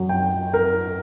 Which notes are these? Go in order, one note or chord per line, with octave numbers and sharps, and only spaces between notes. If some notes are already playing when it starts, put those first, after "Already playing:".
Already playing: F#2 F#3
G5
A#4